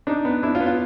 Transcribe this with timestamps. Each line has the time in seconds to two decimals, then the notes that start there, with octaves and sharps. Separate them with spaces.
0.07 D4 D#4
0.25 B3
0.43 D4 E4
0.55 F4
0.60 B3
0.66 F4